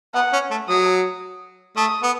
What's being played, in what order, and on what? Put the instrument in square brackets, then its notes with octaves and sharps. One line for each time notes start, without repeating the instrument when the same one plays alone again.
[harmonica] B3 [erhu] F#5
[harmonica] C#4
A3
[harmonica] F#3 [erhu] D#6
[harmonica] A3 [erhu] D#6
[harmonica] B3